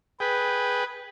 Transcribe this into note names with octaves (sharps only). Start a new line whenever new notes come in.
G#4 B4 G5